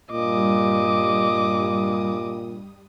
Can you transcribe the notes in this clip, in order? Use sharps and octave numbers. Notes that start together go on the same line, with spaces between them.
G2 A#2 G3 D#5 D6 D#6